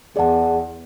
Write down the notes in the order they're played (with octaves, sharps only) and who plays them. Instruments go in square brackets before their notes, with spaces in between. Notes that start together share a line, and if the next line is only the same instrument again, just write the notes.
[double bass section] E2 [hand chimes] G#4 D5 F#5 A5